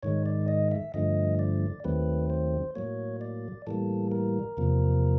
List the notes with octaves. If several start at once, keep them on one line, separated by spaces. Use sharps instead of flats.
G#2 D#3 G#3 C#5
D5
D#5
E5
G2 D3 F3 A3 D#5
D5
D#2 D#3 F#3 A3 C4 B4
C5
A2 F#3 A#3 C#5
D5
A2 E3 G3 A#3 A4
A#4
E2 C3 F3 A#3